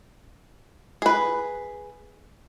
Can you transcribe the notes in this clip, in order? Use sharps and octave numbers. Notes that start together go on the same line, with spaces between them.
G#4 B4